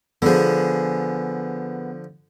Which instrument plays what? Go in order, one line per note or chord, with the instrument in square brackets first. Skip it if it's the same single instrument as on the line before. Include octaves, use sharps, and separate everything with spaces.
[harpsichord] D3 F3 [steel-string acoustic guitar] B3 G#4